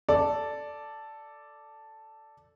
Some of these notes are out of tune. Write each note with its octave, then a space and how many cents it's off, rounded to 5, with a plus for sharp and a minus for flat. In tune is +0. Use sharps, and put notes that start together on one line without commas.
A4 +0 D5 +0